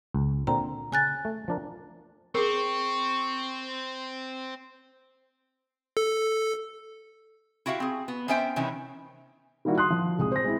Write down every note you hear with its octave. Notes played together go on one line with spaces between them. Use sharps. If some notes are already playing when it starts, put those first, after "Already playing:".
C#2
A#2 D3 C4 A#5
C#3 G#5 F#6 A6
A3
F3 D4 A#4
C4 G#4 A#4 C#6
A4
E4 F#4 G4 E5 F5
C4 G#4
B3
B3 C#4 C5 E5 G5
C3 D#3 E3 C#4 E4
D#3 G3 A#3 E4 F#4
C6 D#6 F#6
F3
C2 G#3 D#6
C5 A#6
G#3 C4 E4